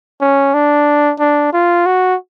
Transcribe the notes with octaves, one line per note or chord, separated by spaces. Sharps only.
C#4
D4
D4
F4
F#4